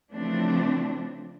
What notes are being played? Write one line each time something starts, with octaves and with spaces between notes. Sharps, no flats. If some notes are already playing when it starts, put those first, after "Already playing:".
C#3 E3 F3 A3 C4 D4